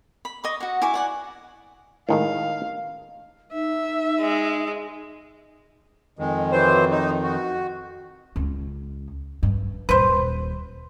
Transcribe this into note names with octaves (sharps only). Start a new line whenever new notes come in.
B5
D#5 C#6 D6
F#4 F#5
E4 G#5 C#6 D6
D5 F#5 G#5
A2 D#3 G#3 F5
D#4 E5
G#3
F2 D#3 G#3
E3 F#3 C5
D#4
F#4
C#2 C#4
G2
D#1 D#2 B4 C5